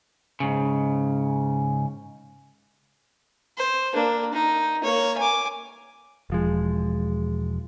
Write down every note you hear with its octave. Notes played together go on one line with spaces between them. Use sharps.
G#2 C#3
C5
A#3 D4
D#4
A#3 C#5
G#5 D6
E1 F3 G#3